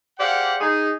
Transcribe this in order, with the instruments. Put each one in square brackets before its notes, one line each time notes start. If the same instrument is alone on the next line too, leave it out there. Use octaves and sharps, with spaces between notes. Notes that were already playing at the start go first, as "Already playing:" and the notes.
[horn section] G4 G#4 C5 D5 F5 F#5
D#4 G#4